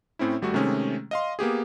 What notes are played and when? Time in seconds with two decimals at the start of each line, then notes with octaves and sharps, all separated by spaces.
0.19 A2 C4 C#4 E4
0.42 G#1 G3 A3 F#4
0.54 C3 D#3 G#3 A3 C#4 G#4
1.11 D#5 F5 C6
1.39 A#3 B3 G4 G#4